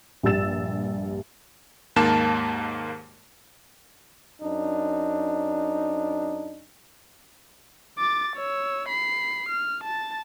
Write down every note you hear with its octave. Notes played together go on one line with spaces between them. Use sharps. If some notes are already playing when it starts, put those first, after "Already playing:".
A#1 G2 G4 E6 A6 E7
D#2 G#2 A#3 A5 E7
F#2 D4 D#4
D6 A6
C#5 E6
B5 C7
F6
A5 A6